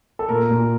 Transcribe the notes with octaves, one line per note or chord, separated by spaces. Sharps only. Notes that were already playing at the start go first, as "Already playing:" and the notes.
A4
A#2 A#4
A#2